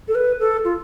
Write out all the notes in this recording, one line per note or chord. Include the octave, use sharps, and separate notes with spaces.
A4
B4
A4
F4